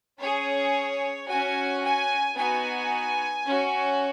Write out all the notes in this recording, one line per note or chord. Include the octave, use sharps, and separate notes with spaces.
C#4 G#4 C#5
C#4 F#4 G#5
G#5
B3 D#4 F#4 G#5
C#4 F#4